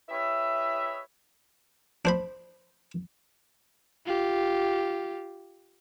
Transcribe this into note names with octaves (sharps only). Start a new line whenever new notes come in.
E4 G4 B4 C#5 D#5 E5
D4 C5 B5
F4 G4